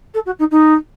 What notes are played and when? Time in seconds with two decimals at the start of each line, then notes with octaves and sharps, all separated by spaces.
0.14 A4
0.26 F#4
0.39 D#4
0.51 D#4